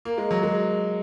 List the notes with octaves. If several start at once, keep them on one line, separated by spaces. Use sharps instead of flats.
A#3
G#3
F#3
G#3